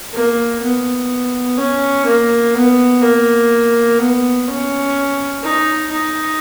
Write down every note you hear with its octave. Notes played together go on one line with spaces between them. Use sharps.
A#3
B3
C#4
A#3
B3
A#3
B3
C#4
D#4
D#4